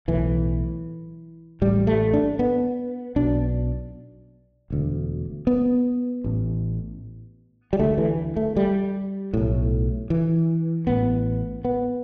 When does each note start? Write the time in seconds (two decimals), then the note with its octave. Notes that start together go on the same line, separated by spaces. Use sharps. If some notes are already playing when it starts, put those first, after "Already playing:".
0.08 B1 A2 E3
1.61 A1 A2 G3
1.87 A3
2.13 D4
2.39 B3
3.16 B1 B2 D4
4.70 E1 D2 D3
5.47 B3
6.24 A1 A2
7.73 G3
7.79 D2 D3 A3
7.98 E3
8.36 A3
8.57 G3
9.34 B1 A2
10.10 E3
10.87 A1 A2 B3
11.65 B3